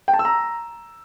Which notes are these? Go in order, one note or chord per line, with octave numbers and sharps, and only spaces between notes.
G5
A5
E6
A#5